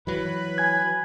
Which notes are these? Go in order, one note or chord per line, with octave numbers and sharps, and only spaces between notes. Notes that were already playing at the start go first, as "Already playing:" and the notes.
E3 F#3 B4 B5
G#5 G#6